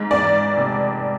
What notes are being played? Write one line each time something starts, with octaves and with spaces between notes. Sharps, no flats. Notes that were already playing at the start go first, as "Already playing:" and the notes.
Already playing: G#2
E2 D5
F1